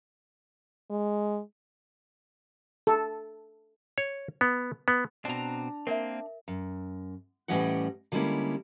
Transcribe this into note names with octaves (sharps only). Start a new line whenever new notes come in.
G#3
A4
C#5
B3
B3
B2 C4 D4 A#5
A#3 C4 A#4 E5
F#2
A2 E3 G3 C#4 D#5 F#5
D3 G3 G#3 A#3 C#4 E4